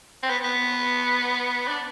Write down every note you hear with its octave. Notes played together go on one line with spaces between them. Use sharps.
C4
B3
B3
D4